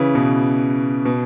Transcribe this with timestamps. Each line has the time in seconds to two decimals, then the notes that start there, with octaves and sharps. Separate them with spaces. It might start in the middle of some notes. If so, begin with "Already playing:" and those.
Already playing: C#3 E3
0.15 B2
1.05 B2